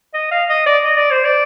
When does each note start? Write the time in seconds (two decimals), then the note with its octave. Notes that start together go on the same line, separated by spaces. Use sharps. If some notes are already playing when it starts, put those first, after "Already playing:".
0.14 D#5
0.31 F5
0.49 D#5
0.66 D5
0.84 D#5
0.98 D5
1.11 C5
1.25 D5